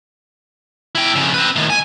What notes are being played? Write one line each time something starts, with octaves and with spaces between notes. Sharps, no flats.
E4 G5
F2 C#3
C4 B4
A2 D#3
G#5